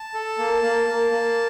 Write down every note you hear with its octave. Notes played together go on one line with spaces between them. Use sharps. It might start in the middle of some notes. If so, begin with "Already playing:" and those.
Already playing: A5
A4
A#3
A#3
A#3
A#3